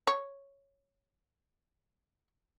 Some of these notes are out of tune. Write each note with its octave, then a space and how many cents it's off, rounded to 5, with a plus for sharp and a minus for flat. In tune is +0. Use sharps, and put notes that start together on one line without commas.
C#5 +0